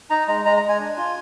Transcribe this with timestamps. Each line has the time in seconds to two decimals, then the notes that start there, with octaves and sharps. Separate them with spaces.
0.10 D#4 A#5
0.28 G#3 A#5
0.45 G#3 A#5
0.57 A#5
0.63 G#3
0.69 G#5
0.80 D4
0.97 F4